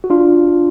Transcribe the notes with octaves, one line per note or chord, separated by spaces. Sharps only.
F#4
D4 F4